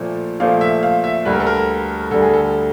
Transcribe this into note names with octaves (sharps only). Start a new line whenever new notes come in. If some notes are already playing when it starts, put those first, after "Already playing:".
Already playing: A#2 F3 A3
A#2 F3 A3 F5
E5
F5
E5
D2 D3 G3 B4
A#4
A4
A#4
D2 D3 G3 A4
G#4
A4